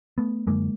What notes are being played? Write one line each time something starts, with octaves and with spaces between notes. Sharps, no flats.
A3 B3
F#2 D3 G#3 A#3